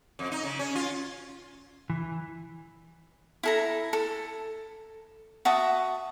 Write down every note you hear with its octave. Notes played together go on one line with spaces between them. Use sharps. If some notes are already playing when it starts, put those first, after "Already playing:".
F2
D#4
C#3
C#4
F4
E3
E4 A4 A#5
A4
F#4 E5 A5 D#6